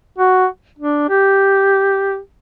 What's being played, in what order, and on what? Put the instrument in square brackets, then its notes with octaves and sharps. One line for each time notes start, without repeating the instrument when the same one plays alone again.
[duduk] F#4
D4
G4